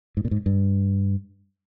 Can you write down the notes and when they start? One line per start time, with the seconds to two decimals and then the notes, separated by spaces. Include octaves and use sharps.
0.17 G#2
0.25 A#2
0.31 G#2
0.46 G2